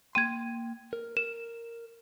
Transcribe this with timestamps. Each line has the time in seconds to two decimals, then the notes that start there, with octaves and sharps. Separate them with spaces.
0.15 A#3 G5 C6 G#6 D#7
0.93 A#4
1.17 A#4 E7